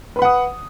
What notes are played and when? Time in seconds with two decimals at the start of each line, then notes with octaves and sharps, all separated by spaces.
0.16 B4
0.19 B5
0.22 F#5
0.25 D#6